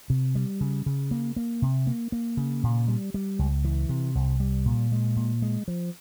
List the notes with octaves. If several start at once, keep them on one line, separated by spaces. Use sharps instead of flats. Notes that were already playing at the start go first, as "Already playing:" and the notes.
C3
G3
C#3
C#3
A#3
A#3
C3
A#3
A#3
C#3
A#2
G3
G3
C#2
E3
C3
C2
G3
A#2
G#3
A#2
G#3
F3